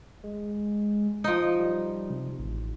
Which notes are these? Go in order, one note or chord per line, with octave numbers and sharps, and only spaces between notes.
G#3
F3 D#4
G3
C3
A1